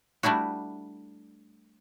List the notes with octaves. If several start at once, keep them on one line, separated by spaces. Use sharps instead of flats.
G3 A3 D4 E4 F#4